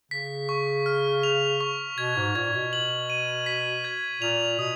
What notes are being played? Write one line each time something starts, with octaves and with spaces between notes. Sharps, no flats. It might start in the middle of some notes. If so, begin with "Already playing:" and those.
C#3 B6
C#6
F6
F7
C#6
B2 G#6
G#2
A#2 G#6
B2
F#7
D#7
B6
G#6
A#2 F7
B2 D#6